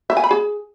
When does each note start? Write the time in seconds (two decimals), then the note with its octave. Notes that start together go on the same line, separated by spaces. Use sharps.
0.10 E5
0.17 G#5
0.24 B5
0.31 G#4